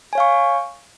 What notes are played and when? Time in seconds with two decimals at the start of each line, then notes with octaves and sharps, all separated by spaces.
0.13 G#5
0.15 C#5
0.18 F5
0.20 C#6